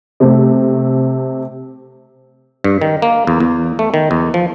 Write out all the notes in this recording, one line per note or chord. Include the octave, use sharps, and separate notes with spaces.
C3 A3 C4
G2
D#3
A#3
E2
E2
A3
D#3
E2
F3